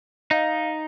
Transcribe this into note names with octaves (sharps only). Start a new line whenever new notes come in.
D#4 D#5 F5